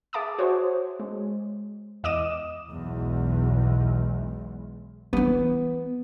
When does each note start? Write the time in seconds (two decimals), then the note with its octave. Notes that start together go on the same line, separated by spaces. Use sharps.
0.13 G#4 E5 A5 D6 D#6
0.39 F#4 C5 C#5
1.00 G#3
2.04 E2 D#5 D6 D#6 D#7 E7
2.70 B1 E2 G#3
5.13 E3 B3